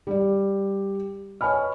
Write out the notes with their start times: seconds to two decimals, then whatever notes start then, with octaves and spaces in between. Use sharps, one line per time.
0.07 G3 D5
1.41 B4 C#5 D#5 G#5 B5 F6